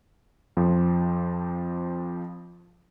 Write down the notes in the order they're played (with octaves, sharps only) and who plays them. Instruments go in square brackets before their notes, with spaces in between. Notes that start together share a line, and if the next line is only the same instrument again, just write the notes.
[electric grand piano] F2 F3